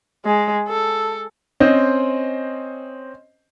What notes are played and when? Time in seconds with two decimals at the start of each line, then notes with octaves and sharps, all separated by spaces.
0.25 G#3
0.68 A4
1.60 C4 C#4 C5 D#5